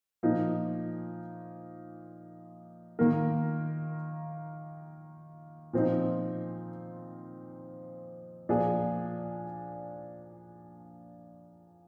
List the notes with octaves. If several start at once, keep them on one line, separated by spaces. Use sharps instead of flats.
A#2 F3 A#3 D#4
D#3 A#3 F4 A#4
A#2 F3 C4 D#4
A#2 F3 A#3 D4 G#4